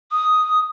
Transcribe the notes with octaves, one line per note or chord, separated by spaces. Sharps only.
D#6